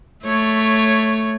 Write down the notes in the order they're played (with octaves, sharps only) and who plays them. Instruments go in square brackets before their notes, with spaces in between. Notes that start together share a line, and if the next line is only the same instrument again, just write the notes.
[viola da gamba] A3 C#5